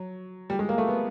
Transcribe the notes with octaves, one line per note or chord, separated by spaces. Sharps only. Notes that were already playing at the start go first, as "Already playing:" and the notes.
Already playing: F#3
G3
G#3
A#3
A3
B3